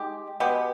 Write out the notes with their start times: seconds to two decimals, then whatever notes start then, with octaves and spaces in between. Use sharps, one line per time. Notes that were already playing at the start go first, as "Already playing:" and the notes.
Already playing: G#3 D#4 G4
0.40 B2 G#3 B3 G4